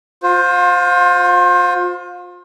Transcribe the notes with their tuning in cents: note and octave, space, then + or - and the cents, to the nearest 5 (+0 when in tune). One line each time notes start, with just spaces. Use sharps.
F4 +35 C5 +0